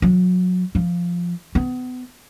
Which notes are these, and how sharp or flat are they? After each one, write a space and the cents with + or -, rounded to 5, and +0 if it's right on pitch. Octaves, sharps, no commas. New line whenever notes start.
F#3 -25
F3 -5
B3 +30